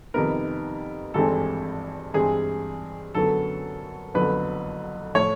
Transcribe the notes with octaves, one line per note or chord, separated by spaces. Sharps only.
F2 C3 D#3 G3 B3 A#4
G#1 G2 E3 G#3 C4 A4
G2 E3 G#3 C4 G#4
F#2 D3 F#3 B3 A4
F#1 F2 D3 F#3 B3 B4
A2 F3 C#5